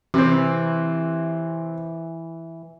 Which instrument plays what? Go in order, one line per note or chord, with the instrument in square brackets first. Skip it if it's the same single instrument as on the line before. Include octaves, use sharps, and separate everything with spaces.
[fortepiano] C3 C4 [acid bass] E3